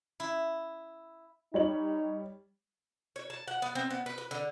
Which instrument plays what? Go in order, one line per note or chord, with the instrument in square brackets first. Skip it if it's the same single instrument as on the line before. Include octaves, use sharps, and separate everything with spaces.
[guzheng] E4
[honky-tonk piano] G3 C#5 F#7 [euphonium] D#4
[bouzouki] C#5
A5
F#5
B3
C4
B3
B4
B4
D3